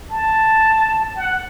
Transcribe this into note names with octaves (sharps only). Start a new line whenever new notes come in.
A5
F#5